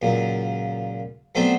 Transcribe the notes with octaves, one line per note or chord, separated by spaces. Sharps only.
C#2 F#2 A#2
F#3 A3 B3 C4 D4 C5